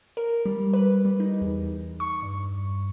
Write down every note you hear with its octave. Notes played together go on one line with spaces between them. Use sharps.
A#4
G3
B4
G3
D#4
E2
C#6
G2